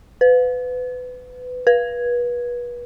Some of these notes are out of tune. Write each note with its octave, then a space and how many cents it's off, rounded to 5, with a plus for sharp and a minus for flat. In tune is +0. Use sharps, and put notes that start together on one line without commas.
B4 +25
B4 -30